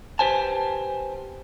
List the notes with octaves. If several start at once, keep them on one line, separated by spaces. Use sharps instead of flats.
G4 B4 C5 G#5 A5